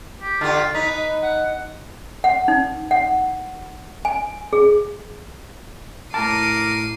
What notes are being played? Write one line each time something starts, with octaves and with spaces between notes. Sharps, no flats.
G4
D3 F4 G4
D#4 B4
F#5
F#5
D#4
F#5
G#5
G#4
A2 A#4 A5 D6 C7 D#7